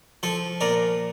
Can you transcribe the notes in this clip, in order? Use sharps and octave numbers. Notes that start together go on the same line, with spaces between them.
F3 A4 C5
A#2 A#4 D5